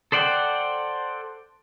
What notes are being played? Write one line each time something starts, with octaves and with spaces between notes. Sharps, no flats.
A4 C5 D5 F#5 G5